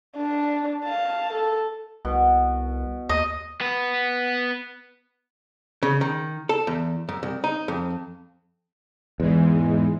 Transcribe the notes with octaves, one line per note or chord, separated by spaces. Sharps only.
D4
F5 A5
A4
C2 B2
D#2 D#5
B3 B4
C#3
D#3
A4
E2
F#2
C2
D#4
F2
E2 G#2 E3 G#3